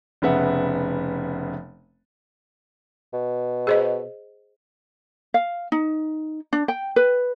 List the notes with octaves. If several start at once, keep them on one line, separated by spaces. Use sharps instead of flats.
F1 C#3 B3 E5 F#5
B2
G#4 C5 D#5
F5
D#4
D4
G5
B4